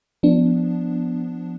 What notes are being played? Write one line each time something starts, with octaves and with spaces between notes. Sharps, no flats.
F3 B3 D4